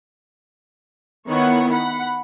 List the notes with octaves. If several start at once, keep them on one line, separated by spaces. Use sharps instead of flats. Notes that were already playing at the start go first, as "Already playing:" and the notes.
D#3 B3 E4 C#5 F#5
F#5 B5